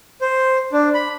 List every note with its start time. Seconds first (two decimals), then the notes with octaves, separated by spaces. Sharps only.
0.21 C5
0.72 D4
0.94 B5